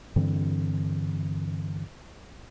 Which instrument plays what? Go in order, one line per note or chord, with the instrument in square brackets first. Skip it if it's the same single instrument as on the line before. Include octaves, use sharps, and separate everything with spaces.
[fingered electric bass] G2 D3 E3 C4